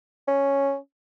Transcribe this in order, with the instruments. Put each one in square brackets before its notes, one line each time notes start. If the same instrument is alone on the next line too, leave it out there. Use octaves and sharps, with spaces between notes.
[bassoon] C#4